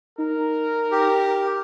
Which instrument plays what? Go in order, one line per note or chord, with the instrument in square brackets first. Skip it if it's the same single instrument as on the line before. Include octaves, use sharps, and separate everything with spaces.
[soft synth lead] D#4 [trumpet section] A#4
[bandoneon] G4